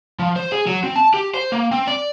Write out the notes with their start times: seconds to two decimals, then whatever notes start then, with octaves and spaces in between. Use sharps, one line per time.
0.19 F3
0.36 C5
0.52 G#4
0.67 F#3
0.84 C4
0.96 A5
1.14 G4
1.34 C5
1.52 A#3
1.72 C4
1.87 D5